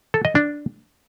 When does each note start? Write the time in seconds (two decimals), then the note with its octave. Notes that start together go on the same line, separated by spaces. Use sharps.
0.14 A4
0.25 D#5
0.35 D4